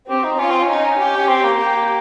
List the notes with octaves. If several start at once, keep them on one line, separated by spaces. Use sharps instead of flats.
C4 G4
D#4
C#4 F4
C4
C#4
D#4
G4
C#4
C4
A#3
G4